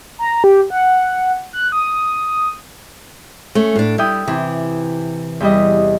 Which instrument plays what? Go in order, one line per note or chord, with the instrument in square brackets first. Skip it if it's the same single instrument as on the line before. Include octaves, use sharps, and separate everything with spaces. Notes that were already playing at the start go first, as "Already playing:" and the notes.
[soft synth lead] A#5
G4
F#5
F#6
D#6
[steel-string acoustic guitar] A3 C#4
A2 D4
[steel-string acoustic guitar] G3 [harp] E4 G5 D#6
[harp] C3 [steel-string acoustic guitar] E3
[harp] E2 G3 D#5